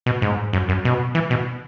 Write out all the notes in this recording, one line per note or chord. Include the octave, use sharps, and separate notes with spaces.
B2
G#2
F#2
F#2
B2
E3
B2